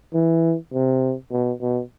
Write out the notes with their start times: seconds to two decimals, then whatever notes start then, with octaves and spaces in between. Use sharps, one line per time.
0.14 E3
0.73 C3
1.32 B2
1.61 B2